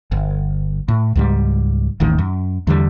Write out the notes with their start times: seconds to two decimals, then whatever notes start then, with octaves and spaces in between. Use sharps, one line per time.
0.12 G1
0.88 A2
1.15 C#2 G#2 G3
2.00 D#1 A1 D#3
2.18 F#2
2.67 E2 D3 E3 G3